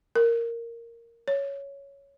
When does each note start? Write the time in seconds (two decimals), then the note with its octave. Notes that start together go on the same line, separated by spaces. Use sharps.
0.15 A#4
1.28 C#5